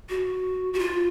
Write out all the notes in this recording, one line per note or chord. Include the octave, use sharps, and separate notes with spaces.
F#4
F#4
F4